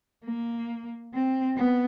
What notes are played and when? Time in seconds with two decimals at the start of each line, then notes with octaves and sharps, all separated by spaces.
0.26 A#3
1.14 C4
1.57 B3